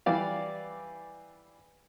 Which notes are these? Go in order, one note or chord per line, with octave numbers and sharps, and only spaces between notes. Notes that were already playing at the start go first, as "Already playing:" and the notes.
E3 G3 D5 F5